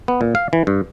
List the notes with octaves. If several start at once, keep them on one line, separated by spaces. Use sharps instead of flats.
B3
A#2
F5
E3
G2